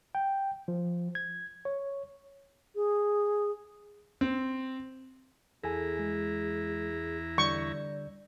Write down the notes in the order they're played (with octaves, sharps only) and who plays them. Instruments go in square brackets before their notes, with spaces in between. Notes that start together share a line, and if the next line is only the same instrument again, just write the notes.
[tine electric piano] G5
F3
G#6
C#5
[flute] G#4
[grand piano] C4
[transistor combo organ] E2 E4 A#5 [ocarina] G#4 [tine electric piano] A4 G#5
[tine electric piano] G#3
[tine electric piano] D3 G3 G6 [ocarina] D5 [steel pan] C#6